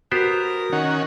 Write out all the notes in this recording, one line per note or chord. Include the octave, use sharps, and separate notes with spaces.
B3 F#4 G4 A#4 C5
D#3 C#4 F#5